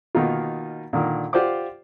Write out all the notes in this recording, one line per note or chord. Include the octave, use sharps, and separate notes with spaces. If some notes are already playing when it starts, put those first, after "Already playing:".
B2 D#3 A#3 D#4 F4
A#2 D3 D#3
F4 G4 C5 D5 F#5 D6